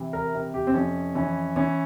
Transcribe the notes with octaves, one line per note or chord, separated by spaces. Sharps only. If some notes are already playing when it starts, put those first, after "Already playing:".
Already playing: C3 E3
A#4
C3
G4
C4
F2 C#4
E3 C#4
E3 C#4